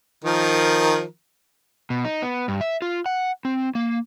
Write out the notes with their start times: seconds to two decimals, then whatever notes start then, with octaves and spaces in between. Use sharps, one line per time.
0.24 D#3 F3 A#4
1.90 B2
2.05 D#4
2.22 B3
2.48 G2
2.61 E5
2.82 F4
3.06 F#5
3.45 C4
3.75 A#3